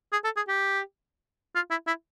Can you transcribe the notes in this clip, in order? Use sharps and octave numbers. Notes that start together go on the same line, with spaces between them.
G#4
A4
G#4
G4
F4
E4
E4